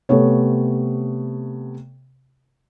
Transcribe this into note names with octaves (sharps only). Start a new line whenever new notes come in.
C3 A3 B3 C#5